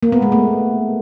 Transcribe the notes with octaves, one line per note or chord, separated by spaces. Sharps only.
A#3
B3
G#3
A3